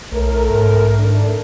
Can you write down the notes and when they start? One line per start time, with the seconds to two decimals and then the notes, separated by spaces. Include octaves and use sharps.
0.12 B1 A2 A3 A#4
0.50 G#2
0.97 D#3 A3 D4